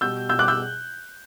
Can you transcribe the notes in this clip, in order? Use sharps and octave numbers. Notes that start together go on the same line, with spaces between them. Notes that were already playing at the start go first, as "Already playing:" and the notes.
B2 G3 E6 G6
B2 E6 G6
G3 D6 F#6
E6 G6